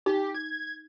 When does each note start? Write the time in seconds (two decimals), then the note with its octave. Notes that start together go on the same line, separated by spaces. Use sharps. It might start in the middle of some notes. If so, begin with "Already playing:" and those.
0.06 D#4 G4
0.34 G#6